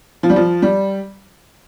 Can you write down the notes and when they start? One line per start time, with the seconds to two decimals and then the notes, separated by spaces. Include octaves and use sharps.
0.23 F3
0.30 G3
0.36 F3
0.62 G3